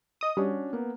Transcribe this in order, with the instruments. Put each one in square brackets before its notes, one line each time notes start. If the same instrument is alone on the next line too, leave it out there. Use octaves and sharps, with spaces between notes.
[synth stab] D#5 D#6
[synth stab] G3 [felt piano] C#4 D4 F#4
[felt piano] A#3 B3